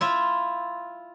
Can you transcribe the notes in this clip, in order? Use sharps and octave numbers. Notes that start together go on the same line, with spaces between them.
E4 F4 E5